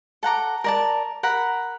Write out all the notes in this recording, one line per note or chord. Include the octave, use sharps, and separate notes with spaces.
A4 F#5 A#5 D6
A#4 D5 A5
A#4 F#5 B5